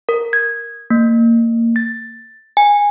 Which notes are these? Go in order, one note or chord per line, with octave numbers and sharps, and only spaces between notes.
A#4
G#6
A#3
A6
G#5